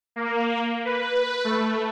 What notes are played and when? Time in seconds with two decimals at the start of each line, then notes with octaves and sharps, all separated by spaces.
0.16 A#3
0.85 B4
1.45 A3